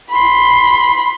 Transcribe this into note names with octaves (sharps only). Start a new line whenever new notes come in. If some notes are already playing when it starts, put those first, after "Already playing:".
B5 C6